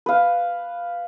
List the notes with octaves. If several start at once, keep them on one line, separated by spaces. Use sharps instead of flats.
B4 F5